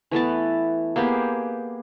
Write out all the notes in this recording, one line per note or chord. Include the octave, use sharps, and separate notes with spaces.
E3 A3 B3 A5
A#3 B3 G4 G#4